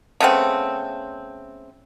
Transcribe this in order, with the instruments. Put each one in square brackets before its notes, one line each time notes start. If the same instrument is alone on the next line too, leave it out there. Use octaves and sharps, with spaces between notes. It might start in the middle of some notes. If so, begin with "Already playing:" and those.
[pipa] C#3 A3 B3 C4